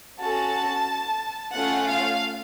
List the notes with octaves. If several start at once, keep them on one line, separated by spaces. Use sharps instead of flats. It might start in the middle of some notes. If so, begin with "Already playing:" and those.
C#4 F#4 A4 A5
A3 C#4 F4 A4 F#5
F5